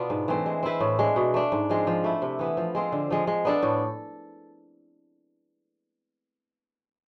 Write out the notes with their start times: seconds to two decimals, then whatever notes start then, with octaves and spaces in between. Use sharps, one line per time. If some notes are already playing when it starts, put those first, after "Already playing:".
Already playing: B2 B3 D4 F4
0.10 G#2
0.28 E3 A3 C4
0.46 G#3
0.63 C4 E4 B4
0.80 A2
0.99 G#3 D4
1.16 B2
1.34 A3 D4
1.52 G#2
1.70 F3 G#3 C4
1.87 F3
2.04 A3 E4
2.22 C3
2.39 E3 B3 E4
2.57 F3
2.75 G#3 C4 F4
2.92 D3
3.11 F3 G#3
3.27 G#3
3.45 B3 D4 A4
3.63 A2